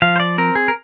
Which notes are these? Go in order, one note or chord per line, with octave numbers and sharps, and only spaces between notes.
F3 F5
C5
D5
C4 A#4
G#4
A#4